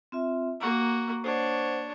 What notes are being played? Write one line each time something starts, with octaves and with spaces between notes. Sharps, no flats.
C4 F4 E5
A#3 F#4 A#5
D4 C5 C#5 F#5